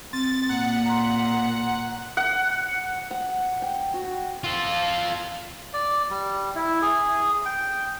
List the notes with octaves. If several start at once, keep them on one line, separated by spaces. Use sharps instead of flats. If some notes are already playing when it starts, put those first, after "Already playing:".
C4 A6
A#2 A#3 F#5
A#5 C6
F#5
F#5
G5
F#4
F4 A4
D5
G3
E4
G#4
G5